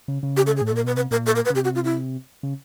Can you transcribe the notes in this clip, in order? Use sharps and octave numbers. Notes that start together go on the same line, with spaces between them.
C#3
C#3
G4
A4
G#4
A2
A4
A#2 A#4
B2 B4
C3 B4
A#2 A#4
A4
A#4
B4
C#3
C3 G4
F#4
F4
E4
C#3